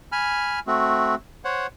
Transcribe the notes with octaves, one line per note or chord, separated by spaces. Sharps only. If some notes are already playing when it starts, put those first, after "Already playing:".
G#5 B5 F6
A3 C4 F#4
C5 C#5 F#5